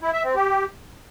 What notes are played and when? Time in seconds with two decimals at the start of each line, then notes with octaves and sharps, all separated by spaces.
0.01 E4
0.13 E5
0.24 C4
0.35 G4